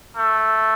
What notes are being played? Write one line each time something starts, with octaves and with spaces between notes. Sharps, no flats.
A3